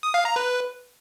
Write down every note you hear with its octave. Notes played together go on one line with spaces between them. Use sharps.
D#6
F5
A#5
B4